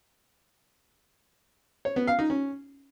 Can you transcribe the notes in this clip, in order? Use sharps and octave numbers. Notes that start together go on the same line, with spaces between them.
C#5
B3
F5
D#4
C#4